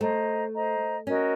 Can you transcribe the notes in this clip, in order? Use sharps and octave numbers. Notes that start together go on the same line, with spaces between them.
A3 C5 D#5 A#5
C5 D#5 A#5
C#4 F#4 A#4 D#5